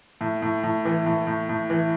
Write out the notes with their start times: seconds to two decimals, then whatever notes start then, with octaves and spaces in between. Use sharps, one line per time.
0.21 A2
0.42 A2
0.63 A2
0.85 E3
1.06 A2
1.27 A2
1.49 A2
1.70 E3